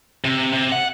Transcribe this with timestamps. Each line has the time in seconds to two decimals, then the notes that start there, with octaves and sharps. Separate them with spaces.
0.25 C3
0.53 C3
0.72 F#5